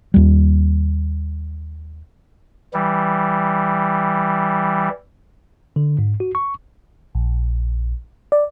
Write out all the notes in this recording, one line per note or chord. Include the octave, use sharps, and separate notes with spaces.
D#2 G3
E3 G3
D3
G#2
F#4
C#6
A#1
D5